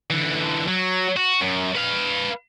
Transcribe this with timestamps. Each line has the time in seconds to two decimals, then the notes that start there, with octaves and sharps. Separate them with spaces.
0.10 D3 E3
0.68 F#3
1.17 F#4
1.41 F#2
1.75 B4 F5